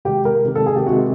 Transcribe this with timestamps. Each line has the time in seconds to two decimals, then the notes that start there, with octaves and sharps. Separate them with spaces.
0.05 C3 D#3 G#3 G4
0.25 A#4
0.46 C3 D#3 G#3
0.55 A4
0.66 G#4
0.76 G4
0.87 C3 D#3 G#3 F#4